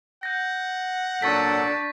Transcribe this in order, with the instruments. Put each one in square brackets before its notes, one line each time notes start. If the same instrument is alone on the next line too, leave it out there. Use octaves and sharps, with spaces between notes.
[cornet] F#5 [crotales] G6 A#6
[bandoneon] A#2 F#3 A4 [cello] D4 [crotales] C#6 A6 B6